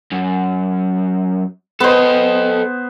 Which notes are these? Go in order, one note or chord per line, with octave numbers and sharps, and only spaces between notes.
F#2
B3 A4 C5 D#5